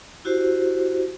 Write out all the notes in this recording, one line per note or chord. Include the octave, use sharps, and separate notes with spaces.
E4 F#4 G4 C5